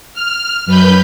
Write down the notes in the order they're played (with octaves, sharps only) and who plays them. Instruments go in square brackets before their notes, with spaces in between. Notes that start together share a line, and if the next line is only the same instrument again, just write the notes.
[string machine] F6
F#2 B4 B5 G6